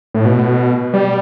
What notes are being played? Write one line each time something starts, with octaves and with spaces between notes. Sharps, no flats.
A2
B2
G3